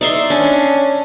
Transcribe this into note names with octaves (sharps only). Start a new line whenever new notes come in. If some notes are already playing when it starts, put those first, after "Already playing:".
D#4 D5 E5 C6
C#4 D4